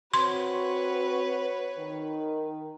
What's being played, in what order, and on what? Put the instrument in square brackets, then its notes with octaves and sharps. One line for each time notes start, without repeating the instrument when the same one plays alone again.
[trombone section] C4 F#4 [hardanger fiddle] B4 C#5 [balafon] C6
[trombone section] D#3